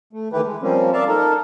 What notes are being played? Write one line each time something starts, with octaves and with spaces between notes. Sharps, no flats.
A3
D#3 E3 A3 E4 G4 B4
G#3
F3 G3 A#3 C4 C#4
A#4 D5 E5 F5 A5
D#4 A4 A#4